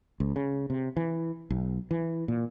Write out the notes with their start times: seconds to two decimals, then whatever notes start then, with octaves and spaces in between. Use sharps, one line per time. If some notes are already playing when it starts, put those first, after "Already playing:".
0.20 C#2
0.36 C#3
0.70 C3
0.97 E3
1.50 B1
1.91 E3
2.28 A#2